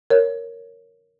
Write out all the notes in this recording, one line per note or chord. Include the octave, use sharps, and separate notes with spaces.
A#4 C#5